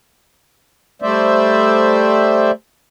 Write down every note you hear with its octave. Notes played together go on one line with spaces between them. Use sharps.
G3 A3 C5 D5 E5